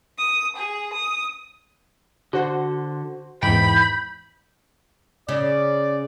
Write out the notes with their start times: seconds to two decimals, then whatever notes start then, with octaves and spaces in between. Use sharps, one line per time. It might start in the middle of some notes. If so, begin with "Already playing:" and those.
0.17 D#6
0.56 G#4
0.93 D#6
2.33 D3 F#4 C5
3.43 E2 G#2 E3 G5 B5 G6
5.29 C#3 D5